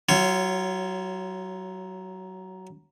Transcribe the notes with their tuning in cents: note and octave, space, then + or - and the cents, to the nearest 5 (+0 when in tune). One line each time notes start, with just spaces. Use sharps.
F#3 +20 F4 -25 C#5 +0